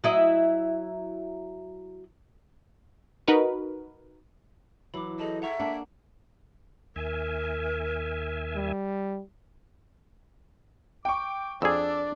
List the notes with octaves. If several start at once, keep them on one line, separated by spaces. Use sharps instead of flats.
F#3 E4 D#5
D#4 F#4 A#4 B4
E3 F#3 B5 D6
G#4 A4 D#5 A5
E5 F#5 A#5 C#6
A#3 D4 F#5
D#2 A#4 E5 G#5
G3
G5 C#6 D6
F2 D4 G#4 D5 E6